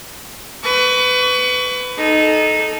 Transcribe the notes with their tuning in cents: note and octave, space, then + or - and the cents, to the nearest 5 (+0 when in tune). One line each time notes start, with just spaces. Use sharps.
B4 +25 C#6 +35
D#4 -5 A4 -20